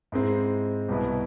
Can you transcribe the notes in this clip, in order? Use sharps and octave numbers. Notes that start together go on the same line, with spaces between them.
G#2 G#3 C4 E4
C2 B2 B3 E4